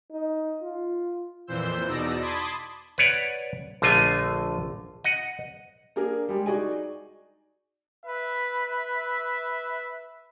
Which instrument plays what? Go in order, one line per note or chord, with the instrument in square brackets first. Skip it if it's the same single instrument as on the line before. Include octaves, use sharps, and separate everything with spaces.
[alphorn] D#4
F4
[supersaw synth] F2 A#2 E3 C5 E6 G6
E2 B2 D#4 D5 E6 A#6
A5 B5 C6 D6 D#6 G#6
[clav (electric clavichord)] B4 C#5 D5 F#5
A#1 D3 A3 F4 D#5 G#5
D#5 F#5
[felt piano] A#3 D4 G#4 A#4
G3 G#3 D4
D#4 F#4 G#4 D5 D#5 G#5
[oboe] B4 [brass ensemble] E5